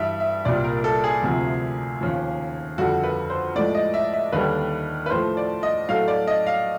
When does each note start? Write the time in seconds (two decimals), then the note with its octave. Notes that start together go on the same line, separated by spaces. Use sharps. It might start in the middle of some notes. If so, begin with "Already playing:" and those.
Already playing: G2 E3 G3 E5
0.20 E5
0.45 C2 A#2 G3 D5
0.64 A#4
0.84 A4
1.04 G#4
1.22 D2 C3 F3
2.01 D#2 C#3 F3
2.78 F2 D3 G3 F#4
3.04 B4
3.30 C5
3.55 A2 F3 G#3 D5
3.75 D#5
3.94 E5
4.13 E5
4.32 D#2 D3 G3 B4
5.06 B4
5.10 A2 F3 A3 C5
5.37 D5
5.63 D#5
5.89 A2 F#3 A3 F5
6.08 D5
6.27 D#5
6.47 F5